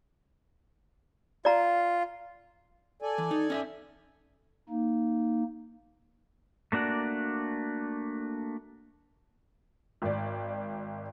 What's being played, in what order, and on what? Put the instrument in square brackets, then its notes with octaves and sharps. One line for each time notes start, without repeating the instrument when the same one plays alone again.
[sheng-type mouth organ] F4 [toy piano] D5 A#5
[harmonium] A4 D5 G#5
[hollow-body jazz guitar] E3
D#4
C#4 D#5 E5
[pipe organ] A#3 D#4
[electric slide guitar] A3 A#3 D4 F#4 D5
[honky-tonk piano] G#1 D5